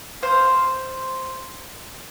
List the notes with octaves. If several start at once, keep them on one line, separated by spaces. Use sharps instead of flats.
C5 F5